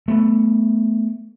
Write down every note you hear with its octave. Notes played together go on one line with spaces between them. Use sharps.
A3 B3